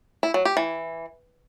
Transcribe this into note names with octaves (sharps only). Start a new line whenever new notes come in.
E4
F#3
G4
E3